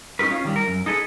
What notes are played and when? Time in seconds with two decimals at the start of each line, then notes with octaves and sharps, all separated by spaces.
0.19 C#4 D#4 F4 A#4 B4
0.31 C#4 F4
0.44 D#3 G3
0.56 A#4
0.67 F#2
0.86 D#4 G#4 A4 B4